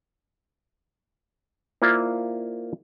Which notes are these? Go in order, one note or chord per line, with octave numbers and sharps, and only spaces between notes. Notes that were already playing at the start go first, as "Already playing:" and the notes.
A#3 E4 F4 C5 D5